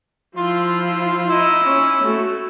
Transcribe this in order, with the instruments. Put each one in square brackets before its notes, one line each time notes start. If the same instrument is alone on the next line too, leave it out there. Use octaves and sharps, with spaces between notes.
[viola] F3 E4 [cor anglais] F4
[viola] D#4 D#5 [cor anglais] E4
[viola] C#4
A3 F#4